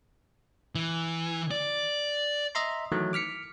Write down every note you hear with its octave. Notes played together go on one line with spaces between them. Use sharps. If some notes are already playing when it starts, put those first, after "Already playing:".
E3
D5
D#5 E5 A#5 C6
D#3 E3 F#3 A3
D6 F6 B6 C#7